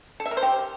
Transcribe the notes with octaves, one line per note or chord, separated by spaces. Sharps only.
A4
E5
A#4
C5
G4